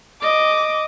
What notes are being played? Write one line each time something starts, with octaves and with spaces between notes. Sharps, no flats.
D#5 D6